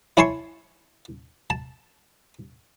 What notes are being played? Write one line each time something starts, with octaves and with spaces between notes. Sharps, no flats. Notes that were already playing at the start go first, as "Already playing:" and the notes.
E4 C#5 G#5 A5 C6 C#6
A5